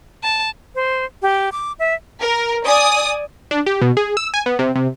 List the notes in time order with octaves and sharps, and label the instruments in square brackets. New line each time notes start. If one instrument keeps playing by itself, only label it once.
[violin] A5
[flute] C5
G4
D6
E5
[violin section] A#4
D5 G#5 D#6
[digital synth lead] D4
G4
B2
G#4
E6
G#5
B3
C3
C3